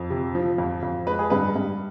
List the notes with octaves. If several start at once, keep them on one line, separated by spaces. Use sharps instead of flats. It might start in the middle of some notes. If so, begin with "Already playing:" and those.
Already playing: F2
C3
F3
F2
F2
G#3 B4
G#4
G2 B4
G2